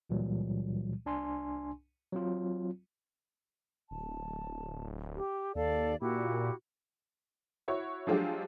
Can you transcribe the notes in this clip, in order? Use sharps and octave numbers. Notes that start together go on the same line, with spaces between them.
C#2 A#2 E3 F#3 G3
C2 D4 G#5 C6
F#3 C4 F4
D1 A5
G4
D#2 A4 D5 F5
A#2 E4 F#4 G4
E4 F#4 C#5
F3 F#3 G#3 D4 F4 G4